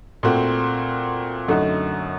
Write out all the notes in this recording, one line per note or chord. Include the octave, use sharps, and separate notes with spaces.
A#2 A3 C4 F#4
F#2 D3 A3 D#4 F#4